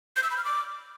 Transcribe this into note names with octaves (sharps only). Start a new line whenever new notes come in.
G6
E6
B5
F6
D6